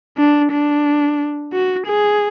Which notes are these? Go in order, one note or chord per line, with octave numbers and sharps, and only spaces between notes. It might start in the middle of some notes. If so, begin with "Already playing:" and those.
D4
D4
F#4
G#4